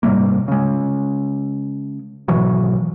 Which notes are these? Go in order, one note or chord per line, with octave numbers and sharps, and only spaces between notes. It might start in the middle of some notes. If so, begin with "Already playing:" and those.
G#2 C3 G3 A#3
C#3 G#3
G#1 B2 E3 F#3